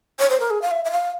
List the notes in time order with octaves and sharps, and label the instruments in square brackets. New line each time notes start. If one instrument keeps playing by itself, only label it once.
[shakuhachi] C#5
C5
A#4
G#4
F5
E5
E5
F5